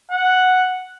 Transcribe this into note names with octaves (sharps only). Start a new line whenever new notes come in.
F#5